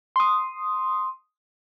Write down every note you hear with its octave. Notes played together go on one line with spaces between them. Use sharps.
C6 D#6